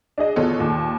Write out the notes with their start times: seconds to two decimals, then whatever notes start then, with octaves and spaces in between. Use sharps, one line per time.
0.18 D4 G#4 D#5
0.36 E2 B2 F4 A4 C#5
0.59 D#2 A#2